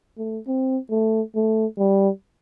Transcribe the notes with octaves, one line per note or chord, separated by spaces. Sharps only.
A3
C4
A3
A3
G3